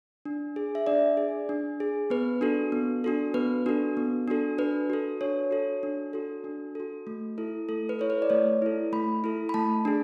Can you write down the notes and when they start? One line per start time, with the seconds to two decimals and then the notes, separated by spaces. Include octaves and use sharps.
0.25 D4
0.56 G#4
0.75 E5
0.87 D4 D5
1.17 G#4
1.49 D4
1.80 G#4
2.10 B3 B4
2.41 D4 F#4 A4
2.72 B3
3.04 D4 F#4 A4
3.34 B3 B4
3.66 D4 F#4 A4
3.97 B3
4.28 D4 F#4 A4
4.58 D4 B4
4.90 F#4 A4
5.21 D4 C#5
5.51 F#4 A4
5.83 D4
6.13 F#4 A4
6.44 D4
6.75 F#4 A4
7.07 A3
7.38 E4 A4
7.69 A3 A4
7.89 B4
7.99 E4 A4 C#5
8.10 B4
8.22 D5
8.30 A3 C#5
8.62 E4 A4
8.93 A3 B5
9.24 E4 A4
9.49 B5
9.54 A3 A5
9.85 D4 G#4